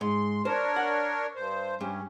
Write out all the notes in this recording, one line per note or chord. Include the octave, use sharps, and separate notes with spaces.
G#2 C6
D4 A#4 C5 C#5
F#5
G2 C5
G2 C#4